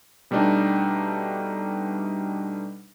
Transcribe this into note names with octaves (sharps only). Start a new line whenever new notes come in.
B2 G3 A3 D4 D#4